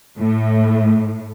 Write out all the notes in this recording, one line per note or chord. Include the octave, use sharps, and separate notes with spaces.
A2